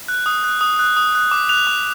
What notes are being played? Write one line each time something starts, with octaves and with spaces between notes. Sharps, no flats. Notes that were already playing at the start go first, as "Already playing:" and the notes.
F#6
D#6
F#6
D#6
F#6
D#6
F#6
D6
F#6 F7
D6